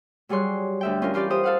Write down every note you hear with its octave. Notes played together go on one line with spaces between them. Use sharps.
F#3 G3 G#4 C#5 C6 F#6
D2 E5 G5
C#4 F4 A#4
E3 F4 G4 D5 G6
G4 C5 D#6
A4 F5 F#5